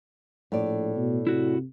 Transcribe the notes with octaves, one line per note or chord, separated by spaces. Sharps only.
A#1 A2 D5
B2
C3 E4 F#4